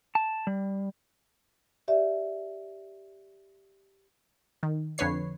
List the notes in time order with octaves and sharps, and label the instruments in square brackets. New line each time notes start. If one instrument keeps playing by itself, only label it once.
[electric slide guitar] A5
G3
[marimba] G4 D5 E5
[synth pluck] D#3
F2 D3 B4 C#5 C7